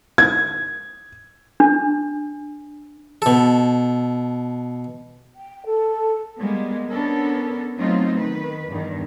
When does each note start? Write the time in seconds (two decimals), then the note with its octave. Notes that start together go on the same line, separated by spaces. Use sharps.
0.18 G#6
1.60 D4
3.22 B2 A4
5.36 G5
5.66 A4
6.39 G3 G#3 A#3 B3
6.89 B3 C#4 D4 A4 A#4
7.78 F#3 A3 B3 C4 D#4 F4
8.18 D#3 B4
8.69 E2 G2 D#3